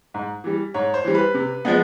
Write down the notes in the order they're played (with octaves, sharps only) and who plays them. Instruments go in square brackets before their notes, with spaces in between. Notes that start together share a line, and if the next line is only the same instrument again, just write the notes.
[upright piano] G#2
E3 G3
G#2 C#5
C5
E3 G3
B4
C3
F3 G#3 B3